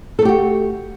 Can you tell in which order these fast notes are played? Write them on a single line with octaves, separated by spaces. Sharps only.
A4 A3 G4 F#4